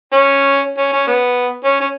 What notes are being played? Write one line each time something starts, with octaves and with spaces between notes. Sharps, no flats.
C#4
C#4
C#4
B3
C#4
C#4